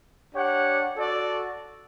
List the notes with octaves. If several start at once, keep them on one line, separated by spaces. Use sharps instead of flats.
D4 G4 C#5 F#5
F#4 A4 D5